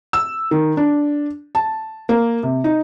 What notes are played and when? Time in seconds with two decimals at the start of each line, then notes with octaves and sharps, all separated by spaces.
0.13 E6
0.51 D#3
0.77 D4
1.55 A5
2.09 A#3
2.43 C3
2.64 D#4